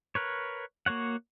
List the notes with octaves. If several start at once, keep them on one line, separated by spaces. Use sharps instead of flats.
A#4 B4 C#5
A#3 F#4 C#5 F#5